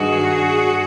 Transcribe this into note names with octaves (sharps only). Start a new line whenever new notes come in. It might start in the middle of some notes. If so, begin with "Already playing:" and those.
Already playing: G2 D#3 F#4 G#4
G2